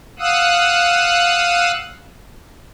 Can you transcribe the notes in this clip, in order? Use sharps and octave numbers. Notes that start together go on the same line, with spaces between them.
F5 F#5 D#6 E6 F#6